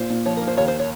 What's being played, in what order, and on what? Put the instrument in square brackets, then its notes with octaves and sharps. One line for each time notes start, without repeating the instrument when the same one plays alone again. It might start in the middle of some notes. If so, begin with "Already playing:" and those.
Already playing: [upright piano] A#2 [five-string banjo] C5
[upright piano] A#2
[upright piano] F3 [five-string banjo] C#5
[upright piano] A#3 [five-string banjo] A#4
[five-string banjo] C5
[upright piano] D#2 [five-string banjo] C#5
[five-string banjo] C5
C#5